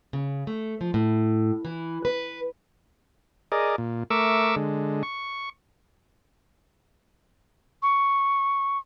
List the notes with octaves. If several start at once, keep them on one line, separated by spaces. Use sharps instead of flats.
C#3
A3
F3
A2
E3
B4
G#4 A#4 D5 D#5
A#2
A3 A#4 E5 C#6 D6 E6
D3 G#3
C#6
C#6